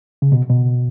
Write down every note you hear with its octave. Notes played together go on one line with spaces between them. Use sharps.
C#3
B2
B2